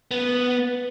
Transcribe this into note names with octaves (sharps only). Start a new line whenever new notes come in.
B3